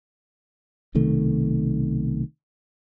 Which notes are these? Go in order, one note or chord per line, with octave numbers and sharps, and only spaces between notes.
B1 C3 D#3 A3